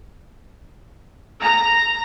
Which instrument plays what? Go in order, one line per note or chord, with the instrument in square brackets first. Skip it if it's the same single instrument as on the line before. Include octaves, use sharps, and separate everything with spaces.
[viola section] A#5